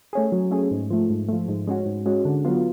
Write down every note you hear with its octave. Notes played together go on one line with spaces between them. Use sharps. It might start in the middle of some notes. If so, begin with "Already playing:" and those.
A3 C#4 G#4
F#3
A3 C#4 G#4
G#2
F3 A3
G#2
F3 A3
G#2
G#3 C#4 F#4
G#2
G#3 C#4 F#4
D3
F#3 B3 F4